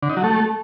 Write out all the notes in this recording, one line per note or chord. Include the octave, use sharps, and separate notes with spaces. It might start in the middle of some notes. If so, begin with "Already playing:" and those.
D3
D#4
F#3
A3